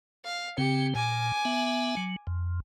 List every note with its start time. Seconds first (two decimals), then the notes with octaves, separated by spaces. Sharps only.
0.25 F5
0.58 C#3 C4 G4 C#7
0.95 A#2 G#5 D6
1.45 B3 E5
1.97 F#3
2.27 F2